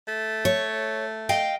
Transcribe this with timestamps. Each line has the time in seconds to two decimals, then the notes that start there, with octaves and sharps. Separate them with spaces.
0.08 A3
0.45 C#5
1.29 D#5 F5 G5